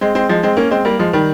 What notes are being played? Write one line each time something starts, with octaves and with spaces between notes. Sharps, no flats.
G#3 C4
G#3 C4
F3 G#3
G#3 C4
A#3 C#4
G#3 C4
G3 A#3
F3 G#3
D#3 G3